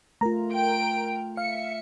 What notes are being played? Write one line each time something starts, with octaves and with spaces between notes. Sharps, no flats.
A3 F4 A#4 A#5
G5 D7
E5 F5 C#7